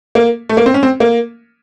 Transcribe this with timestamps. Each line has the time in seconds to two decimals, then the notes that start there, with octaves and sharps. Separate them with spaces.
0.15 A#3
0.49 A3
0.57 A#3
0.66 C4
0.74 C#4
0.83 C4
1.00 A#3